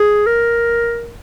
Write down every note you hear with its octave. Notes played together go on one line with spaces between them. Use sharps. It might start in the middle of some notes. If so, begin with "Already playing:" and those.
Already playing: G#4
A#4